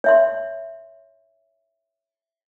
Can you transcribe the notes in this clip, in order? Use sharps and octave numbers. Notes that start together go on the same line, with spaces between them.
C#5 E5 C6